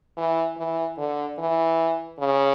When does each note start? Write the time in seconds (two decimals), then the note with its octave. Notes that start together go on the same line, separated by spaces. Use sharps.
0.17 E3
0.58 E3
0.98 D3
1.38 E3
2.20 C#3